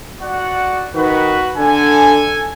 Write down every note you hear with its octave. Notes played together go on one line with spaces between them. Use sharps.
F#4 D5 F#5
D#3 F#4 B4
D3 A4 G#5